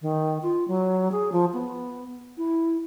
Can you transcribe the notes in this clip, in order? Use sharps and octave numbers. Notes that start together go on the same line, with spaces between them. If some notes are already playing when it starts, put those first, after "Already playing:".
D#3
F4
F#3
G#4
F3
B3
E4